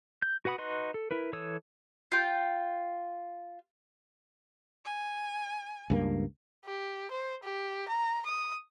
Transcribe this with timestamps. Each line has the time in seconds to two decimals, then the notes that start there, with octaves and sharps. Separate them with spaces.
0.22 G6
0.45 F#4 B4 F#5 B5 D#6
0.58 D#4 F#4 B4 D#5 C6
0.94 A4
1.11 E4 A#4 B4
1.33 E3 A4 C#5 D#6 E6
2.12 F4 G5
4.85 G#5
5.90 C#2 G2 A#3
6.65 G4
7.11 C5
7.43 G4
7.88 A#5
8.26 D#6